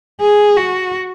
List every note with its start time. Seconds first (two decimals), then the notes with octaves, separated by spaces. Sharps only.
0.21 G#4
0.57 F#4